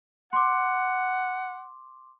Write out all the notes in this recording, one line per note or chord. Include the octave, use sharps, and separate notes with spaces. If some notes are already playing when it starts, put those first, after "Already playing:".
F#5 C6 D6